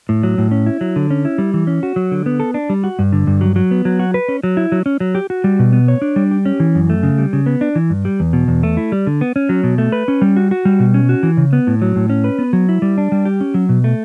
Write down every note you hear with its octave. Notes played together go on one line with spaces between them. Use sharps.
A2
F#3
A2
C#4
E4
F#3
D3
C#4
E4
G3
E3
C#4
F#4
F#3
D3
B3
A4
D4
G3
F#4
G2
D3
G2
F#3
F#3
B3
F#3
F#4
B4
C#4
F#3
E4
F#3
C#4
F#3
G4
F#4
G3
B2
B3
C#5
D4
G3
G4
C#4
E3
F#2
A3
C#3
G3
C#3
B3
D4
E3
G2
G3
E2
B2
E2
A3
E4
G3
D3
B3
C#4
F#3
B2
A3
B4
C#4
G3
F#4
F#4
G3
B2
C#4
F#4
E3
C#3
B3
A2
F#3
A2
C#4
B4
B3
F#3
E4
G3
D4
G3
G4
C#4
F#3
B2
A3